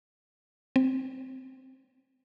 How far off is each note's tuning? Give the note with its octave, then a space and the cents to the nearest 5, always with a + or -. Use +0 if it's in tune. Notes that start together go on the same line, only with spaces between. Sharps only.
C4 +0